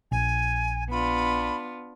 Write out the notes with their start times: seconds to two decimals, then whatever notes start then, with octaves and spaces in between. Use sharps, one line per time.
0.12 A#1 G#5
0.91 B3 D4 F4 B5